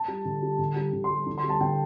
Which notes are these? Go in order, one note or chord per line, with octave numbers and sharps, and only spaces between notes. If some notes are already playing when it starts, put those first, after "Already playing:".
Already playing: A5
G3
D3
G3
D3
G3
D3
C6
G3
D3
C6
G3
A5
D3 G5